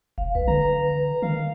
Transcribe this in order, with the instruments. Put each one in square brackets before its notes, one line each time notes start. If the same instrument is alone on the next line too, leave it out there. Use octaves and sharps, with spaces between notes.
[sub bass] E1 [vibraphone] F5
[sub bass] B1 [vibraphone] B4
[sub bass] D3 [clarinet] A#5
[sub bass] D#3 [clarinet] F5